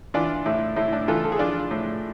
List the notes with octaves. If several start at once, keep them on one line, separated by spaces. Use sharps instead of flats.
E3 D4 F4
A2 E4
A2 E4
D4
E3 F4 A4
A4
G#4
F3 D4 F4
A2